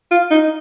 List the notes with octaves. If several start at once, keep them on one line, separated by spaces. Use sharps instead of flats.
F4
D#4